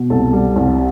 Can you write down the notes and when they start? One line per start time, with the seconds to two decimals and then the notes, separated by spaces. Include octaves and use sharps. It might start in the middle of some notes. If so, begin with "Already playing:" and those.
Already playing: B2
0.10 C2 A4
0.33 G3
0.56 C2